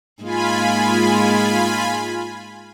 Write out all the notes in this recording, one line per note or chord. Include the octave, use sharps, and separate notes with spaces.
G#2 G#3 A#3 F4 G#5 B5